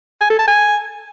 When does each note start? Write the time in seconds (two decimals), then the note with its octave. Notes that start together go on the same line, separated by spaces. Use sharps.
0.21 G#5
0.30 A4
0.39 A5
0.48 G#5